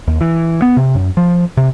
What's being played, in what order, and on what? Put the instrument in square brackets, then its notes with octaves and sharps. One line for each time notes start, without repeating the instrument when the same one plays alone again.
[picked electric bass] D#2
E3
B3
C3
F#2
F3
C3